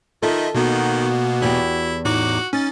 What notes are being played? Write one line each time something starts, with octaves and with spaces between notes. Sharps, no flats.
D#3 F4 A4 D#5 E5
B2 D#3 A#3 B3 F#4
E2 E4 G4
A2 D#4 F#4 D6
C#4 D#4 A6